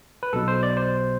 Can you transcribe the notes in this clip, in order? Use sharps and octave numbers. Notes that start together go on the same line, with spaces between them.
B4
B1 B2 A4
C5
D5
C5